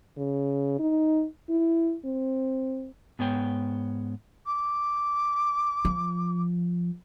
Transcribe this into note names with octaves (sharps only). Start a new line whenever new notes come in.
C#3
D#4
E4
C4
G#2 B3 C#5 G5
D6
F3